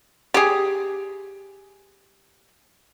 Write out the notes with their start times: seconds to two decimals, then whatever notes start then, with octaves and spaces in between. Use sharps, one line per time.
0.34 G4 G#4